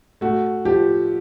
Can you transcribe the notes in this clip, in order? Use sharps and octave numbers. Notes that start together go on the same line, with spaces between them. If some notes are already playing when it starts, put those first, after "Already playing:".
A3 F#4
F3 G4